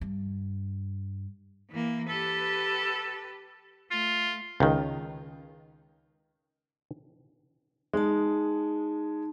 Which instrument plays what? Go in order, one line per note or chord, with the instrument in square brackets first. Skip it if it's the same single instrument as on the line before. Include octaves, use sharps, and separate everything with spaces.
[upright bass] G2
[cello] E3 A#3
[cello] G4 B4 [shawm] A4
[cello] A3 [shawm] F4
[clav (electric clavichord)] C#2 D#3
[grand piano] G#3 [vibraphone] D#4 A5